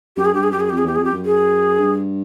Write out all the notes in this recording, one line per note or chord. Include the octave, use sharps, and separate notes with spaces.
F#2 G4
G#4
G2 G4
G#4
F#2 G4
G#4
F2 G4
G#4
E2 G4
F2 G#4
G4
F#2
G#4
G2